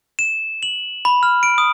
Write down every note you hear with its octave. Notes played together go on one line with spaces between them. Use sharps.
E7
F#7
B5
F6
D7
D#6